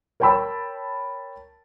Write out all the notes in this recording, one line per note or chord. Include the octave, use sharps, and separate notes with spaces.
A#4 C#5 G5 A5 B5 E6